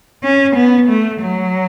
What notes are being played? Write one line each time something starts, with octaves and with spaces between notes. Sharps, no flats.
C#4
B3
A3
F#3